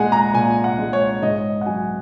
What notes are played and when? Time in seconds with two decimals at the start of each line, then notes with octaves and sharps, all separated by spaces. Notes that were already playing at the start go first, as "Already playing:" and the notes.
Already playing: A#2 G#3 F#5 G#5
0.12 A#5
0.34 A#2 G#5
0.64 F#5
0.78 G#3
0.93 C#5
1.22 G#2 D#5
1.61 F#5
1.66 F#3 G#5